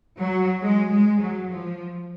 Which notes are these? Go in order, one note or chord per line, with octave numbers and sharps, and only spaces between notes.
F#3
G#3
G#3
F#3
F3